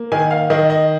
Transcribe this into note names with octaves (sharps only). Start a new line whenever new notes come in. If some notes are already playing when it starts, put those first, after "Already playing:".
Already playing: A#3
D#3 G#5
F5
D#3 D#5
D#5